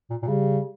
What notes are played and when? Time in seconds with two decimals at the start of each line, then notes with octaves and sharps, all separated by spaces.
0.10 A#2
0.22 A#2
0.27 C#3 G3